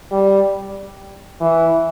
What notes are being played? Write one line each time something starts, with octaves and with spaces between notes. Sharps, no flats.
G3
E3